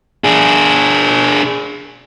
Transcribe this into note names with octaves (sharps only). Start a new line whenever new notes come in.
D4 G#4